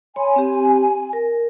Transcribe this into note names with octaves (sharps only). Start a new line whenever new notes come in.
C#5 G#5 B5 C6
C4 G4
A#4